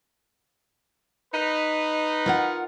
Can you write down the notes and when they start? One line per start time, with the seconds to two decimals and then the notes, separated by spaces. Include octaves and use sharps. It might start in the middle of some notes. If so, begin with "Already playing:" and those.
1.34 D#4 B4
2.26 F4 A#4 F#5